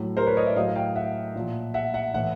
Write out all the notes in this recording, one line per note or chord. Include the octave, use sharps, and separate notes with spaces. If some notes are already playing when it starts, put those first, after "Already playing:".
Already playing: A2 F#3
A#4 C5
B4 C#5
C#5 D#5
D5 E5
A2 F#3 D#5 F5
F5 G5
E5 F#5
A#2 F3
E5 F#5
E5 F#5
A2 E3 E5 F#5